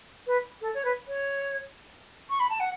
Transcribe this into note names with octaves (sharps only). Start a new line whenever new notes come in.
B4
A4
C#5
B4
C#5
C#6
B5
A5
F#5